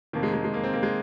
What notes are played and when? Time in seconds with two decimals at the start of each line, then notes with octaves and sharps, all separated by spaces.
0.13 F2 C3 D#3 A#3
0.23 G#3
0.33 G#3
0.44 G#3
0.54 A#3
0.64 C4
0.73 A#3
0.83 G#3